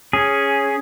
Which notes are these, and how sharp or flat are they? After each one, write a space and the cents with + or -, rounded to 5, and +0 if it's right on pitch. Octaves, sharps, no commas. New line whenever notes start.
C#4 +0 G#4 +0